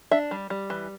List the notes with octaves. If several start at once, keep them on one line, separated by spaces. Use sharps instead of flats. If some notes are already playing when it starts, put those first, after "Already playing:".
D4 E5
G3
G3
E3